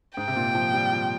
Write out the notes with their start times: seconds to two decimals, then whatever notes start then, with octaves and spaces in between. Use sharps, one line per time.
0.17 G#2 G5
0.28 C3
0.36 A#2
0.55 F3
0.74 G3
0.92 F3